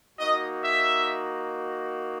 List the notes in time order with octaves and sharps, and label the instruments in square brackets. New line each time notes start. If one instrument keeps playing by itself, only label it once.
[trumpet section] A#3 D#4 F#4 D#5
E5